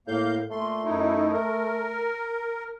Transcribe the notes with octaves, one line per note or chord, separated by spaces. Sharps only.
A2 A#3 F5 G6
A#2 A3 C6
F#2 D#4 E4
A#4